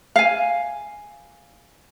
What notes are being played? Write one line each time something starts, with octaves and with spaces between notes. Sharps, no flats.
F5 G#5